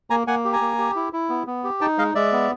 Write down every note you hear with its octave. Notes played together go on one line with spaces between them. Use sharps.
A#3 G#5 A#5
A#3 F#5 G#5
G4
G#5 A#5
A#3
G4
E4
E4
B3
B3
G4
D#4 G5 A5
G#3 D#5 F5
G#3 D5 E5
B3